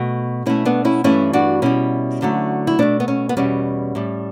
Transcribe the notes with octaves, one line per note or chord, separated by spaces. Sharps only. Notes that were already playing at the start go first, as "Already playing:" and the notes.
Already playing: B2 A3
B2 A3 C#4 E4
B3 D4
C#4 E4
G2 E3 A3 C#4 E4
D4 F#4
B2 G3 C#4 E4
D2 D3 F#3 A3
E4
B2 A3 B3 D4
B3
C#4
B3
E2 B2 G3 C#4
A2 G3